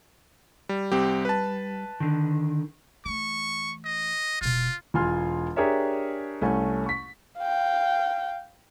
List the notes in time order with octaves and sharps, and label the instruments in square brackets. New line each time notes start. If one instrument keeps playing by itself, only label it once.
[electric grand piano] G3
[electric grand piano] C2 C4 G4 [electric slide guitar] G3
[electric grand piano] B4 A5
[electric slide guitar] D3 D#3
[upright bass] E3 A3 [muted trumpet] C#6
[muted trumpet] D#5
[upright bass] E1 B2 [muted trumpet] F4
[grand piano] E1 F4 G#5 C6 F6
D4 G4 G#4 A#4 C#5 E5
C2 A3 C#4 G#5
C#6 B6
[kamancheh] F5 G5